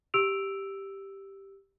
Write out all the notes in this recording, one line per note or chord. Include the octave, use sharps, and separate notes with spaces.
G4 E6 D7 F7